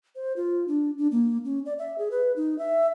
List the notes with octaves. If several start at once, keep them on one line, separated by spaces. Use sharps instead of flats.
C5
F4
D4
D4
A#3
C#4
D5
E5
G#4
B4
D#4
E5